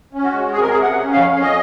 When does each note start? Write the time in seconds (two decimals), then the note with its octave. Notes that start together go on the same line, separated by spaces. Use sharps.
0.13 C#4
0.24 F#4
0.32 G#3
0.52 C3 G#4
0.61 A#4
0.69 C3 G#4
0.82 F#5
0.92 C#4
1.12 F2 F5
1.32 C#4
1.41 D#5